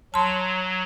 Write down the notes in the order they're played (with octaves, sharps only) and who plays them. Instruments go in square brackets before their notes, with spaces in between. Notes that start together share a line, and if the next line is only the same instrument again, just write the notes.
[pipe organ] F#3 [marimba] A5 C6